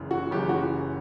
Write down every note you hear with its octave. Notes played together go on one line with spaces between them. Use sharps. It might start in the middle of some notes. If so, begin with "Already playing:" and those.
Already playing: F#1 F#2 C#3 E3
F#4
F#1 F#2 C#3 E3 G4
F#4